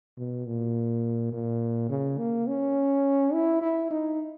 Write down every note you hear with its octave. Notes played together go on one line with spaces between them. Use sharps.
B2
A#2
A#2
C#3
A#3
C#4
E4
E4
D#4